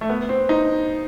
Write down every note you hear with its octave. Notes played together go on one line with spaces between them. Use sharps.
A3
B3
C4
D#4